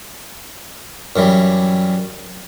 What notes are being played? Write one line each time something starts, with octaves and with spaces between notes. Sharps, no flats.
F#2 E3 G3